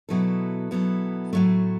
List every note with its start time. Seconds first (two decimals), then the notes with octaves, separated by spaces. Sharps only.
0.09 B2 F#3 B3 E4 A4
0.71 B2 F#3 B3 E4 A4
1.33 A2 F#3 A3